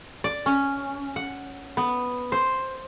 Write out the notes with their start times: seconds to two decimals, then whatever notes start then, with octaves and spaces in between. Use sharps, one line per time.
0.24 D5
0.46 C#4
1.16 F#5
1.77 B3
2.32 C5